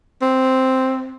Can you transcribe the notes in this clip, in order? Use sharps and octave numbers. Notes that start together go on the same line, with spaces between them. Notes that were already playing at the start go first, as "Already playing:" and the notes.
C4